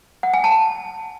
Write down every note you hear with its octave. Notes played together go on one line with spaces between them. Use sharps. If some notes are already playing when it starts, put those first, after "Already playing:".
F#5
G#5
A5